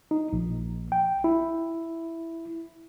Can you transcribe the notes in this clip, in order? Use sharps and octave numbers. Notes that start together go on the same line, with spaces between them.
D#4
A#1
G5
E4